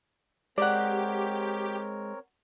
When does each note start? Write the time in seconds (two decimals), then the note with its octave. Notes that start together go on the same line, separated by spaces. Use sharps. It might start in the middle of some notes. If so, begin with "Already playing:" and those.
0.58 G#3 C4 G4 A#4 C#5 D5 F#5